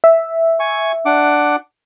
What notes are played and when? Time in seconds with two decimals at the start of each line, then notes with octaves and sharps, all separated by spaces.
0.04 E5
0.60 G#5 C#6
1.06 D4 F#5 D6